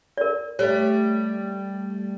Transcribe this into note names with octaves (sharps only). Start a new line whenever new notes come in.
A#4 D5
G3 A3 C#5